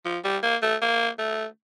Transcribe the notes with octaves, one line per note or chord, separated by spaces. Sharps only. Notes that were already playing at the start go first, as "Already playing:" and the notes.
F3
G3
A#3
A3
A#3
A3